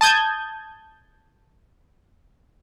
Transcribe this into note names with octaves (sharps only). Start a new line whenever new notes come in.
A5 D#6 G6 G#6